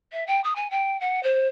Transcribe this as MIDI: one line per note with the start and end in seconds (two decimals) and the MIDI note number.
0.13 0.24 76
0.27 0.41 79
0.44 0.53 87
0.56 0.70 80
0.70 0.99 79
1.00 1.20 78
1.23 1.48 72